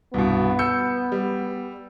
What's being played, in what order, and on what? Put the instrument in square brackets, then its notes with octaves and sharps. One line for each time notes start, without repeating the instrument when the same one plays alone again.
[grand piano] C2 G2 B2 [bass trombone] B3
[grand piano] E6 G6 C#7
G3